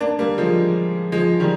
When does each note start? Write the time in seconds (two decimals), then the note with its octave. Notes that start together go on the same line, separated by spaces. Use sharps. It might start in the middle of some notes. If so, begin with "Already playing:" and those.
0.01 A#3 D4
0.19 G3 A#3
0.38 F3 G#3
1.12 F3 G#3
1.40 D#3 G3